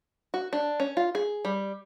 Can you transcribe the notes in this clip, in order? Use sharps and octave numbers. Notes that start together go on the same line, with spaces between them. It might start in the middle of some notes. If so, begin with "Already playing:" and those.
F#4
D4
C#4
F4
G#4
G3